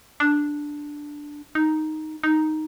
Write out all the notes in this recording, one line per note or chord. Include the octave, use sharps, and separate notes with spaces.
D4
D#4
D#4